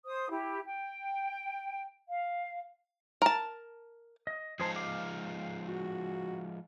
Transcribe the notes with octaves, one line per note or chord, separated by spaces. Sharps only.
C5 D#6
E4 G4
G5
F5
A#4 A5
D#5
F3 G#3 D#4 G#4 C5 A5
F5 D6
F#4